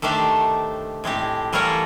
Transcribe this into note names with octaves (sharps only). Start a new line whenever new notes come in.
D#3 A3 D4 G4 C5 D5
A2 G#3 C4 G4
E3 G3 A3 F4 A#4 C#5